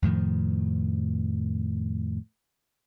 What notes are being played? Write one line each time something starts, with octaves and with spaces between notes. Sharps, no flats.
F2 A2 D#3 F3